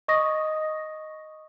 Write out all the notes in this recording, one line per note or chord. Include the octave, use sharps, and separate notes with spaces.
D#5 C#6 D#6 A#6